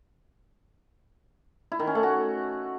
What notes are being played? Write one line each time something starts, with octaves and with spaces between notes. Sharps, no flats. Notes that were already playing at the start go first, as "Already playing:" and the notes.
E4
D#3
C#4
A3
F#4